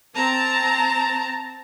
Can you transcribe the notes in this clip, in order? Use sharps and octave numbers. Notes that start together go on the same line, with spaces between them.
C4 A5 A#5